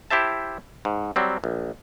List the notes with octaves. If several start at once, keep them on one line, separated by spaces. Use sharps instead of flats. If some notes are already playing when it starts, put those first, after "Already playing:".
E4 G4 C5 E5 A5
G#2
F#3 G3 C4
A#1